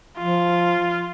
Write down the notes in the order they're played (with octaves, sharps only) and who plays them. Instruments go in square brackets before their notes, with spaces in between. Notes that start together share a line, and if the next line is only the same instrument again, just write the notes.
[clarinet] F3 [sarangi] F4